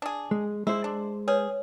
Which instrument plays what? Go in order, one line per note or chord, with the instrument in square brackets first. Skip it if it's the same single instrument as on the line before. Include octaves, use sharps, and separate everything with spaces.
[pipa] D4 G#4
[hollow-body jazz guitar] G#3
[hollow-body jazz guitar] G#3 C5 [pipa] E4
[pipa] D4
[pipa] G#4 [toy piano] B4 C#5